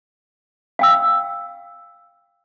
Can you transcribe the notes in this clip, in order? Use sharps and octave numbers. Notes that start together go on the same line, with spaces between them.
F5 G5 E6